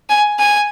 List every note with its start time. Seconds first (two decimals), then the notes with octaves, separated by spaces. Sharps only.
0.10 G#5
0.39 G#5